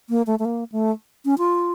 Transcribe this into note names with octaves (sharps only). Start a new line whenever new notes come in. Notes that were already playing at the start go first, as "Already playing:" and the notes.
A#3
A3
A3
A#3
A3
C#4
F4